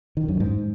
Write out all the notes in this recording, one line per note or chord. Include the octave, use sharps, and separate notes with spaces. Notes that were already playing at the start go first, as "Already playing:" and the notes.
D#3
F#2
G#2